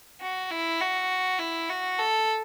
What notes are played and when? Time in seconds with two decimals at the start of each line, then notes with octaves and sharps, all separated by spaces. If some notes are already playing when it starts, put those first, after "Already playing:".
0.21 F#4
0.51 E4
0.81 F#4
1.39 E4
1.70 F#4
1.99 A4